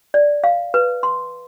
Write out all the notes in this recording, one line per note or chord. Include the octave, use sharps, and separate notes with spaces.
D5
F5
B4
C6